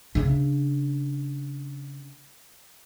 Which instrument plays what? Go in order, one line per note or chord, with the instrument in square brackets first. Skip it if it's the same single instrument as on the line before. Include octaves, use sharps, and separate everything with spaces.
[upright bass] C#3 D4